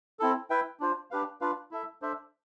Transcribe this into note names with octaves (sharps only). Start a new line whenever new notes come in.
C4 E4 A4
E4 B4 E5 G5
D4 F4 C5
D4 G4 B4 F5
D4 F4 B4 F5
E4 A4 E5
D4 A4 C5 E5